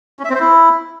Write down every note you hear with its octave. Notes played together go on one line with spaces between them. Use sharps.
C#4
E5
C4
C5
E4